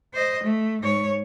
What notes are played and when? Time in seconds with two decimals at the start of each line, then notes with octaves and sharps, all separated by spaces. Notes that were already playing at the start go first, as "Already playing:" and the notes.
0.14 C5 D#5
0.43 A3
0.82 G#2 C#5